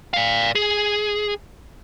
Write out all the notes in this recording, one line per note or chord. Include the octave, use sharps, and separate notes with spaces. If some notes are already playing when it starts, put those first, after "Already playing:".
D5 F5
G#4